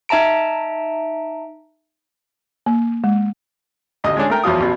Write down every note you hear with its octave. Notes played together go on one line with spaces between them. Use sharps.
D#4 E5 A5 A#5 D7
A#3
G#3
A1 D2 D#5
G#3 C#4 D4 G#4
A3 A#4 G5
E2 B2 F3 F#3 F4 D#6
A1 B2